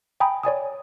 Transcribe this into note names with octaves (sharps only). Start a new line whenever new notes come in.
G5 G#5 A#5 B5 D#6
C#5 D5 G#5 D#6